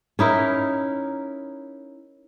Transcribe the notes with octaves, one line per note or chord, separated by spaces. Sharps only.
C#4 D#4 E4 A#4